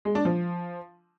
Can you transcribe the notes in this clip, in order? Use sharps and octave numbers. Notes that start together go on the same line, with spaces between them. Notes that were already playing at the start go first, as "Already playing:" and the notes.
G#3
D4
F3